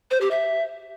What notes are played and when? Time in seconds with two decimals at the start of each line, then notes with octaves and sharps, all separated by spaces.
0.11 C5
0.21 G4
0.31 E5